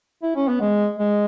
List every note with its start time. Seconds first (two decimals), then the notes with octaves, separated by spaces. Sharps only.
0.23 E4
0.36 C#4
0.48 B3
0.61 G#3
0.98 G#3